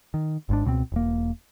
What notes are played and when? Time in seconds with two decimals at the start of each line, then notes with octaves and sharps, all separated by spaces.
0.14 D#3
0.49 G#1 G#2 D4
0.65 C#2 B2 F#3 C4
0.92 E1 A#3